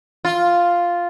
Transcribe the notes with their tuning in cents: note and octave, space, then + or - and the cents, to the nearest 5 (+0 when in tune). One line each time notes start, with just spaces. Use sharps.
F4 +0